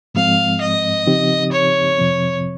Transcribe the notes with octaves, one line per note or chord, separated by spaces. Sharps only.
G#2 F3 G#3 C4 F5
D#5
C#3 F3 C4 D#4 G4
C#5
F2 C3 F3 C4